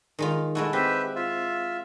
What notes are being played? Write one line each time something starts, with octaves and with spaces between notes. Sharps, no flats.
D#3 G#3 F4
G#3 E4 F#4 A4
C4 G4 B4 E5
F4 E5